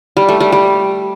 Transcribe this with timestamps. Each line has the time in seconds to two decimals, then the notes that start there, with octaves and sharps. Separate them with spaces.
0.17 G3
0.29 A3
0.40 G3
0.52 G3